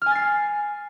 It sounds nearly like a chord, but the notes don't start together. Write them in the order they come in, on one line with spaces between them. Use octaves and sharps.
F6 G#5 A6 C7